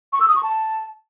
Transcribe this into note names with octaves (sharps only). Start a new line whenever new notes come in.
C#6
E6
D#6
C#6
A5